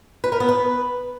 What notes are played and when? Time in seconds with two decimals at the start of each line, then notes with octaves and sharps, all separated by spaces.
0.24 B4
0.32 A#4
0.40 B3
0.49 B4